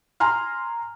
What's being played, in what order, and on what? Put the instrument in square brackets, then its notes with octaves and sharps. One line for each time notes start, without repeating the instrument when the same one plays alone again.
[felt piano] G#5 A#5 C6 F6